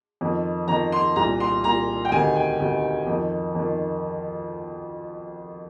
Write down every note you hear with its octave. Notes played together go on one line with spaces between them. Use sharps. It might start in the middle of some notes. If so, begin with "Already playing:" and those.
F2 D#3
F2 D#3 A#5
C6
C2 A#2 A#5
C6
C2 A#2 A#5
G5
D2 C3 D#3 G#5
G5
D2 C3 D#3
F2 D#3
F2 D#3